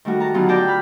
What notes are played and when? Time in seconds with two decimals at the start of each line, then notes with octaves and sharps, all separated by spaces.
0.05 D#3 G3 A3 F#4
0.20 A5 A#5
0.34 D3 F#3 B3 D#4 F4 G4
0.48 D5 G5 A5 A#5
0.68 B5 F6